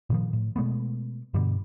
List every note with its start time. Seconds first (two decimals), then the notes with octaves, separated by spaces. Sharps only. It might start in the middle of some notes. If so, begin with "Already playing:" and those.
0.10 A#2 D#3 F3
0.33 A2
0.56 B2 G#3 A3 B3
1.34 G2 B2 D3 G3